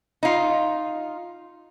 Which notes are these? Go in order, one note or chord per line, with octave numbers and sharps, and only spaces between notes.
D#4 F4